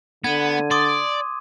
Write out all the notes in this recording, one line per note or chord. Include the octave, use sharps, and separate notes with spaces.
D3 B3 G#6 D#7
D5 C6 D6 D#6